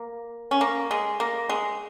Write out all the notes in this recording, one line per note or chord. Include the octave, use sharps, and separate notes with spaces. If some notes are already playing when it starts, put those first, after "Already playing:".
Already playing: A#3
C#4
A#3
G#3
A#3
G#3